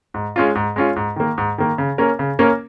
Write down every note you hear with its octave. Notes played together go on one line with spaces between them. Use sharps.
G#2
G#3 C#4 F4
G#2
G#3 C#4 F4
G#2
D#3 A#3
G#2
D#3 A#3
C#3
A#3 C#4 A#4
C#3
A#3 C#4 A#4